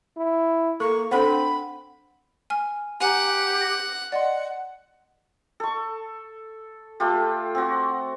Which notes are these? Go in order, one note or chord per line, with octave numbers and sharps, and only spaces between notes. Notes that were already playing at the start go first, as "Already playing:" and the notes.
E4
A#3 A4 C#6
C4 D4 A4 C5 F#5 B5
G#5 F6
G4 F#5 G#5 A#5
A#6
D5 D#5 F#5 C6
A4 C#6
A3 F4 G4
C4 F#4